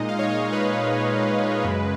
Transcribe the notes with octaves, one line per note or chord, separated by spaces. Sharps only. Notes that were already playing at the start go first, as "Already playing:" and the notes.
Already playing: A#2 G#3 D#4 D#5
F5
C#5
D#5
B4
F#2 C#3 G#3